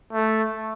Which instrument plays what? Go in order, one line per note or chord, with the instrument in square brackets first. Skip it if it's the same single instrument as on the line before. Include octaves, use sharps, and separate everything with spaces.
[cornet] A3